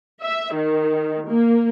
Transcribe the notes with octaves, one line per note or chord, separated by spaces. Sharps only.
E5
D#3
A#3